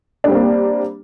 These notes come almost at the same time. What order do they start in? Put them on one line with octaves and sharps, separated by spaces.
D4 G3 C4 A#3